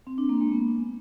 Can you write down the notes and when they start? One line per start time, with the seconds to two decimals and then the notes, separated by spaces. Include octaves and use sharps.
0.07 C4
0.18 D4
0.29 A#3
0.40 G#3
0.52 B3